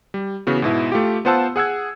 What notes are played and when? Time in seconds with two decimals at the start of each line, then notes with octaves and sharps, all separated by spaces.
0.14 G3
0.47 C#3 E3 B3 F#4
0.62 G#2 B2 E4
0.92 A3 F4 G4
1.25 B3 F4 C5 F#5 A5 E6
1.56 G#4 F#5 E6 G#6